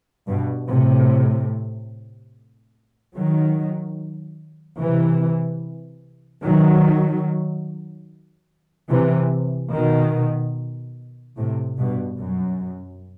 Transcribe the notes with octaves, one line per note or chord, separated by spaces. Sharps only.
G2 B2
A2 C3
D#3 F#3
C3 E3
D#3 F#3
C3 E3
B2 D#3
A2 C3
G2 B2
F#2